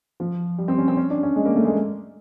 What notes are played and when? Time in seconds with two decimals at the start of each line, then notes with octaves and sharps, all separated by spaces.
0.20 F3
0.58 G3
0.68 C4
0.78 C#4
0.88 C4
0.97 C#4
1.10 D4
1.23 C#4
1.36 G#3
1.46 A#3
1.56 A3
1.65 G#3